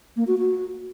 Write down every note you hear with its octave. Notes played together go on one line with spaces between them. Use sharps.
A#3
F#4
F#4